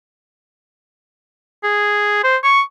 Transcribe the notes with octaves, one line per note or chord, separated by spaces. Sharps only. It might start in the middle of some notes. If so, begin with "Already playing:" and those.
G#4
C5
C#6